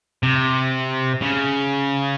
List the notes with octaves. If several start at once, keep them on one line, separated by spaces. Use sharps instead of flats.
C3
C#3